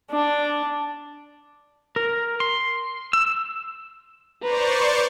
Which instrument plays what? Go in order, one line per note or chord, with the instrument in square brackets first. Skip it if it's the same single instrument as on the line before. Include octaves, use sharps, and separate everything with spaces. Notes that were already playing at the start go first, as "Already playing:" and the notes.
[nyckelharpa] D4
[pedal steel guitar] A#4
C6
E6
[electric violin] B4 A#5 [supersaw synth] C5 D5 C#6